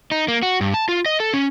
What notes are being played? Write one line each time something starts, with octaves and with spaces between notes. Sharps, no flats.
D#4
A#3
F#4
G2
A5
F4
D#5
A4
C#4